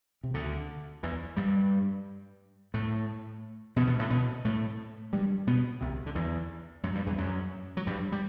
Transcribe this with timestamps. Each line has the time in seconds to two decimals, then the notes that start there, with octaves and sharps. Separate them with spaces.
0.24 C3
0.34 D2 D3
1.03 E2 E3
1.36 G2 G3
2.74 A2 A3
3.76 B2 B3
3.87 B2 B3
3.99 A2 A3
4.10 B2 B3
4.45 A2 A3
5.13 G2 G3
5.47 B2 B3
5.81 C2 C3
6.06 D3
6.15 E2 E3
6.83 F#2 F#3
6.95 G2 G3
7.06 E2 E3
7.18 F#2 F#3
7.77 F#3
7.87 G2 G3
8.12 G3